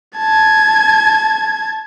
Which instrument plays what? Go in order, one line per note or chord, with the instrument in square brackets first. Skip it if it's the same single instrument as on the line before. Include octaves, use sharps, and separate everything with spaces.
[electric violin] A5 G#6